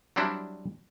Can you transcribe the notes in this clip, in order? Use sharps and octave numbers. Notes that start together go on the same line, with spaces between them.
F#3 G3 C4 D4 E4